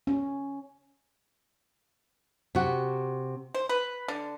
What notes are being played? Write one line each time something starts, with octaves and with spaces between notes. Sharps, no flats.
C#4
C3 F#4
C5
B4
D3